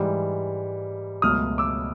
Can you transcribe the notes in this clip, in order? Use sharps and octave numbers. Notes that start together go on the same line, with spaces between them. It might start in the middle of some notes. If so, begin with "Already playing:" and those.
Already playing: G#2 E3 G3
C#2 B2 F#3 A3 D#6 F6
D6 E6